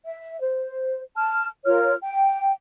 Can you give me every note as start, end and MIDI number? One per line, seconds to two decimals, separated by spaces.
0.05 0.38 76
0.40 1.01 72
1.16 1.48 81
1.16 1.48 89
1.65 1.93 65
1.65 1.93 70
1.65 1.93 73
1.65 1.93 89
2.01 2.52 79